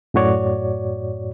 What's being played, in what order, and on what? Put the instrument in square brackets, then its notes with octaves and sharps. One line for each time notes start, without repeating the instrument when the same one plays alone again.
[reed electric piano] F#2 A2 F#4 C#5 D5